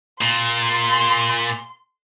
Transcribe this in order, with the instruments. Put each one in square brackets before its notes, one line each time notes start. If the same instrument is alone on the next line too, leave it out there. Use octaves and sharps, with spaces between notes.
[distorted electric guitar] A#2 [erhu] C6